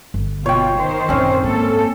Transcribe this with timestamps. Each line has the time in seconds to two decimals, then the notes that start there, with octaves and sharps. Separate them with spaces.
0.14 G1
0.46 B2 F4 C#5 G5
0.77 D#3 C5
1.09 F#2 A#2 C4 C#4
1.44 G#2 A#3 A4